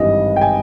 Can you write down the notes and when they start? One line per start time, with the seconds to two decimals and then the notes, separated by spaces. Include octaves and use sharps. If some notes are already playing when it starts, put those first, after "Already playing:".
Already playing: G#1 G2 E3 G3 D#5
0.36 G5
0.41 G#5